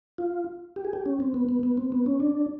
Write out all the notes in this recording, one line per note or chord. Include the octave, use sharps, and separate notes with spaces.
F4
G4
G#4
G4
C#4
C4
B3
B3
B3
C4
B3
C#4
D4